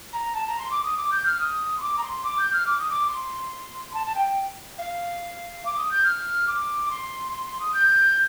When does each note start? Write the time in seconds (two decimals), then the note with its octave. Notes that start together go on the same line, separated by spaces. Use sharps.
0.13 A#5
0.34 A5
0.47 A#5
0.59 C6
0.71 D6
0.83 D#6
0.97 D6
1.12 G6
1.25 F6
1.39 D#6
1.78 C6
1.82 D6
1.97 A#5
2.03 C6
2.24 D6
2.39 G6
2.53 F6
2.66 D6
2.78 D#6
2.90 D6
3.08 C6
3.94 A5
4.06 A5
4.15 G5
4.78 F5
5.65 D6
5.77 D#6
5.91 G6
6.05 F6
6.47 D6
6.89 C6
7.32 C6
7.46 C6
7.60 D#6
7.74 G6